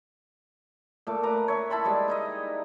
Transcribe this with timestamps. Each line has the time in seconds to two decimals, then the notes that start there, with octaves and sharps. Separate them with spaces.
1.07 A#2 A3 D6
1.23 B4 A#5 D6
1.48 C#5 E5
1.70 E4 A5 B5 C6
1.84 G3 G#3 B4 D6
2.08 D#4 E4 D#5